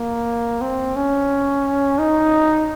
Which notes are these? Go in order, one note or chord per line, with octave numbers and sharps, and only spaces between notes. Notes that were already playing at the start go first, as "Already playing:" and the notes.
Already playing: A#3
C4
C#4
D#4